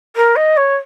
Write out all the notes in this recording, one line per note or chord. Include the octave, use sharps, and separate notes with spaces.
A#4
D#5
C#5